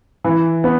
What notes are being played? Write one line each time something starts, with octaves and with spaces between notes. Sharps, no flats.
E3
B3